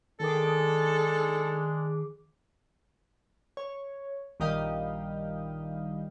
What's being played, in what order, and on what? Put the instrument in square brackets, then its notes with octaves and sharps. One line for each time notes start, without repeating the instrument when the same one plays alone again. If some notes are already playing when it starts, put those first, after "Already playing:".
[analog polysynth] D#3 G#4 D6 [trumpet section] G#3 D4 [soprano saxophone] A4
[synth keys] C#5
A#1 D#3 G3 D#5 F5 G5